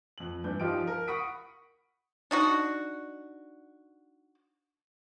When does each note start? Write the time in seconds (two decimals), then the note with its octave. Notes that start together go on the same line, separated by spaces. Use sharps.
0.18 F2 F#7
0.44 G2 E3 D4 G6
0.60 F3 D#4 F4 G4 D#5 D7
0.87 A#4
1.08 F#5 B5 C#6 D#6 B6 D7
2.31 D4 D#4 F#4